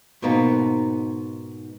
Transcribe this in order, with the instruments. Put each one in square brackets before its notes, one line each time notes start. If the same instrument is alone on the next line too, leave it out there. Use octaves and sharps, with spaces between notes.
[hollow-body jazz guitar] G#2 B2 A#3 B3 D#4